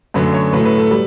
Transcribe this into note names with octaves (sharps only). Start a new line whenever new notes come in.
F#2 D3 F#3 A3 B4
C#5
A2 F#3 A3 B4
B4
A4
G3 B4